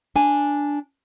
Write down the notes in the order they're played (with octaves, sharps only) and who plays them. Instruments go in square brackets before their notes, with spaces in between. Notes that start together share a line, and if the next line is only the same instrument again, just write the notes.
[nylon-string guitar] D4 G#5